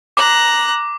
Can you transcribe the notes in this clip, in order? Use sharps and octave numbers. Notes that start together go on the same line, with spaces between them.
A#5 D6 F#6